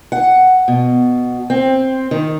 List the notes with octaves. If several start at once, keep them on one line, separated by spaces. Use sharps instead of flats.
F#5
B2
C4
D#3